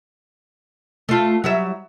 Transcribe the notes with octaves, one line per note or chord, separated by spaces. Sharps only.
A3 F4
F#3 G3 E5